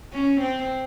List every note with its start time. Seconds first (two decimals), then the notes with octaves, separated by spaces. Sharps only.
0.12 C#4
0.41 C4